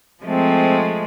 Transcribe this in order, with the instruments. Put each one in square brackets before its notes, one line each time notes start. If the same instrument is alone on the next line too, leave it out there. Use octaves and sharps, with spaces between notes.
[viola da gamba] F3 G#3 A3 [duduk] C4